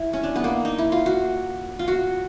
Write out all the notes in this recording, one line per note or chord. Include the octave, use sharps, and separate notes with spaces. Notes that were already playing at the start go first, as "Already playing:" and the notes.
Already playing: E4
C#4
D4
B3
A#3
D#4
E4
F4
F#4
F4
F#4